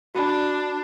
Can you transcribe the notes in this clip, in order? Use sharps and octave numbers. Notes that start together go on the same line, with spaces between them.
D4 F#4 B5